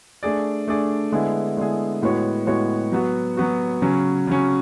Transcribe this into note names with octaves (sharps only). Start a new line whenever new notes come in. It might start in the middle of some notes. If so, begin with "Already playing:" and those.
A3 D4 G#4 D5
A3 D4 G#4 D5
D3 G#3 B3 E4 G#4
D3 G#3 B3 E4 G#4
A2 G#3 B3 F#4 C#5
A2 G#3 B3 F#4 C#5
F#3 B3 F#4
F#3 B3 F#4
C#3 F#3 C#4
C#3 F#3 C#4